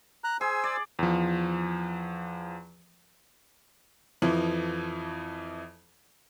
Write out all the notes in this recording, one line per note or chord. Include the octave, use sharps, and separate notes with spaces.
A#5 F#6
G#4 C5 G#5 E6
D5
E2 F3
F2 E3 F3